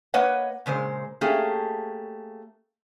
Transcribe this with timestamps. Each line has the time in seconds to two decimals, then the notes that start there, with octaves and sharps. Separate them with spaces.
0.14 A#3 B4 C#5 D#5 F#5
0.66 A#2 C#3 G#3 C5
1.21 A3 A#3 C#4 G4 G#4